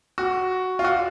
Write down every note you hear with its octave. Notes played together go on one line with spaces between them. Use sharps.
F#4
F4
F#4